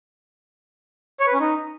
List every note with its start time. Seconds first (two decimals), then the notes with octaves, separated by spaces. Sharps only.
1.20 C#5
1.27 B4
1.33 C#4
1.40 D#4